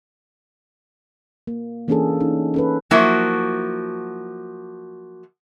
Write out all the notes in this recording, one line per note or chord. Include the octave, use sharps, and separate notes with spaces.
A#3
E3 A#3 C#4 D4 G#4 A4
C#4 D#4
C#4 A4 B4
F3 F#3 A#3 E4 F#4